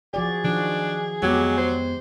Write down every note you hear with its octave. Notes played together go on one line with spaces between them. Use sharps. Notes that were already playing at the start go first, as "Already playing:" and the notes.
F3 F#4 G#4 D5
D#3 F3 D4 F#4
F2 F#3 G#3 B3 G4
C5